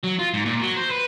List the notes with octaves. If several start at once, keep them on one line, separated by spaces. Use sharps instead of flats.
F#3
F4
G#2
A#2
F#3
C5
B4